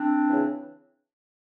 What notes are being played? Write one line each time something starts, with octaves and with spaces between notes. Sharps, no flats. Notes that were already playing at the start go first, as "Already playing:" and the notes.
Already playing: C4 D4
C#3 E3